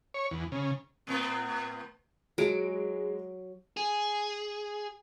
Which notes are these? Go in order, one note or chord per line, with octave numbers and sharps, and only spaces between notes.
C#5
E2
C#3
A2 B3 C4
F#3 G#3 D7
G#4